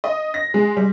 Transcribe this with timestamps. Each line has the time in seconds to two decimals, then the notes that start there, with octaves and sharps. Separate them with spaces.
0.04 D#5
0.34 A#6
0.54 G#3
0.77 G3